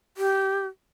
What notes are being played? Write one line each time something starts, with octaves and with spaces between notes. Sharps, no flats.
G4